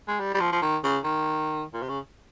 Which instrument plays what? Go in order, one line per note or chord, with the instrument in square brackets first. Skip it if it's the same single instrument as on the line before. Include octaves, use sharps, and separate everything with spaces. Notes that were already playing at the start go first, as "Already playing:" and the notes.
[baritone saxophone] G#3
G3
G3
F3
F3
D#3
C#3
D#3
A#2
C3
C#3